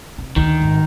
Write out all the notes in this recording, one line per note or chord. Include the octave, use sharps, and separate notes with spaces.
C3
D2 D#3
G#1